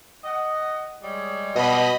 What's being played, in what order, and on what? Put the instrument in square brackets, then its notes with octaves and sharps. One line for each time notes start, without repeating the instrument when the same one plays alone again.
[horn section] D#5 F#5
G3 G#3 C#5
[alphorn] B2 [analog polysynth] D#5 B5